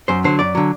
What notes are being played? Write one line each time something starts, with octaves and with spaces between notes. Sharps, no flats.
F#2 C5
D3 F#3 C5
F#2 D5
D3 F#3